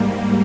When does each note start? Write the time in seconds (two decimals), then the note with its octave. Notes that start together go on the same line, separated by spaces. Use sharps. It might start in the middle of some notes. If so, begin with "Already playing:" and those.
Already playing: G#2 G3 A#3